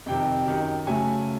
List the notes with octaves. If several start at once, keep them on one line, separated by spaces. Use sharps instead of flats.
F2 C3 D#3 G5
F#2 D#3 F#3
C#3 F#3 A3 G#5